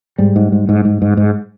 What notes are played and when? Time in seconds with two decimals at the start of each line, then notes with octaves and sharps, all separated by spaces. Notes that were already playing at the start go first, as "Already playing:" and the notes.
0.18 G#2 G3
0.36 G#2
0.52 G#2
0.69 G#2
0.85 G#2
1.02 G#2
1.17 G#2